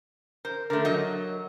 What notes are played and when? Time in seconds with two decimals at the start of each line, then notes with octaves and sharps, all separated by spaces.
0.45 A#4 C5
0.70 D3 A3 A#4
0.85 F#3 D#5